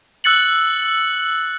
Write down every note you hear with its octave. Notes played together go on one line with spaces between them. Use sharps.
E6 F#6 A6 C#7 F#7